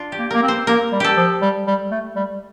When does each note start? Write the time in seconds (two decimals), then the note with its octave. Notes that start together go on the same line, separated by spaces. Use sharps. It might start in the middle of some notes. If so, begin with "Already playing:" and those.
Already playing: D4 F4
0.12 G4
0.18 A#3
0.30 A#3 A#4
0.43 C4
0.48 C5
0.67 A#3 A#4
0.92 G3
1.00 G4 A4
1.16 F3
1.42 G3
1.67 G3
1.91 A3
2.15 G3